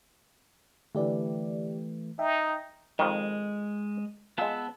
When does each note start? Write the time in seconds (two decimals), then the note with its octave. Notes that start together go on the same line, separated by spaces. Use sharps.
0.95 D3 E3 A3 G4 D5
2.19 D#4 E5 G5
2.99 F2 D#3 G#3
4.38 G#3 B3 F4 A5 E6